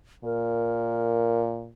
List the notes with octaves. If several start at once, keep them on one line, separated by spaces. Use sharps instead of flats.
A#2 A#4